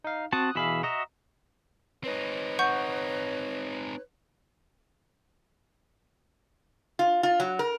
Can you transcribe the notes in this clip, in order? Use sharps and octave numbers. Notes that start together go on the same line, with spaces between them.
D#4 F5
C4 F#4 A5 D#6 F#6
B2 E3 G#4 E5 F5 B5
F#4 D#5 E5 A#5
C4 D#4 B4 C#5
F#5 C#6 G6
F4
F4
F#3
A#4